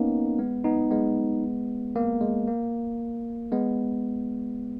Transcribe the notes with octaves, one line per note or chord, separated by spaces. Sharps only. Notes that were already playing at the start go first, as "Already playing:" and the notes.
Already playing: A#3 B3 C#4 D#4
G#3 B3
B3 D#4
G#3 B3
A#3
G#3
A#3
G#3 B3